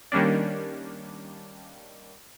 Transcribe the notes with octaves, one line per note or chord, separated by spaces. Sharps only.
D#3 G3 A#3 C#4 D4